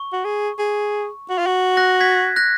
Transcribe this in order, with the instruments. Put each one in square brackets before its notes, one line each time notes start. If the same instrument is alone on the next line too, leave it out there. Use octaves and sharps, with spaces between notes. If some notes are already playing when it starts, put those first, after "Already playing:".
Already playing: [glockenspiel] C#6
[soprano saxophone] F#4
G#4
G#4
F#4
F4
F#4
[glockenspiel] F#6 A#6
G#6 B6
F#6 A#6